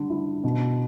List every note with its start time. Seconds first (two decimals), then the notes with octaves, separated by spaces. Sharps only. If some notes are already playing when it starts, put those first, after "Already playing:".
Already playing: D3 G3
0.10 E4
0.44 B2